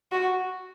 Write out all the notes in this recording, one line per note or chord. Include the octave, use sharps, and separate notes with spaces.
F#4